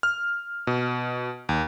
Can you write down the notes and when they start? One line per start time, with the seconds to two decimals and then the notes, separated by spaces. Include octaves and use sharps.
0.03 F6
0.67 B2
1.49 D#2